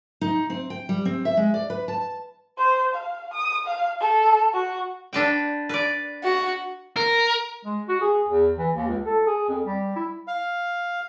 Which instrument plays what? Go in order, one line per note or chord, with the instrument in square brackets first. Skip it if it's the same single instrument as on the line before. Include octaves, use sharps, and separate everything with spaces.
[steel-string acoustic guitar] D#4
C4
G5
G3
C4
E5
G#3
D5
B4
A5
[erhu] C5
F5
D#6
F5
A4
F#4
[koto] D4 B4 G5
B4 D5
[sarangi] F#4
[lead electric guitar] A#4
[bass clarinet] G#3
F#4
G#4
E2
E3
D#2
C#2
A4
G#4
F2
G3
E4
[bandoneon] F5